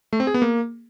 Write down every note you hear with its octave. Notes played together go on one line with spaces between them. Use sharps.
A3
C4
G#4
B3
A#3